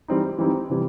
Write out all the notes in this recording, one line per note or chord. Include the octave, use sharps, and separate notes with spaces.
E3 G3 C4 D#4
E3 G3 C4 D#4
C3 E3 G3